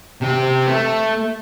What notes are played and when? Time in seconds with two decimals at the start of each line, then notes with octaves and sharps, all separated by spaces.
0.22 C3 G5
0.67 A3